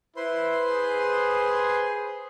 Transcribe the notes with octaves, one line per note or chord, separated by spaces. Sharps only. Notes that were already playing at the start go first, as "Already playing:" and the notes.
E4 B4 C5 C6
G#4